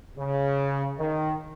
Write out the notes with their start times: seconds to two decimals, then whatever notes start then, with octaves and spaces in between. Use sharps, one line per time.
0.18 C#3
0.98 D#3